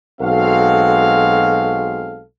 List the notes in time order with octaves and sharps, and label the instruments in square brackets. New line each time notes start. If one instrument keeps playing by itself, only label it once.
[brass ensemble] B1 G#3 C4 F#4 A4 F5